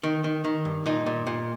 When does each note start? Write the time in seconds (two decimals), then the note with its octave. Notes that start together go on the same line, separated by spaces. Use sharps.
0.03 D#3
0.24 D#3
0.44 D#3
0.65 G2
0.86 A#2 D#4
1.06 A#2
1.27 A#2